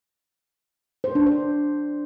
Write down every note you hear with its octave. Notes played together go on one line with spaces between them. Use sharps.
C5
D4
C5